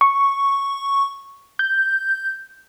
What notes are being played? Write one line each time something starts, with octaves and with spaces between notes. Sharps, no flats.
C#6
G6